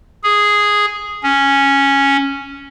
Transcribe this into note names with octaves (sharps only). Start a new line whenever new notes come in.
G#4
C#4